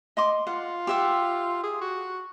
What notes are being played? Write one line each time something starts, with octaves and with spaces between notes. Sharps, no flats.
D#5 C6 D6
F4 F#5
G4 E5 F#5
G#4
F#4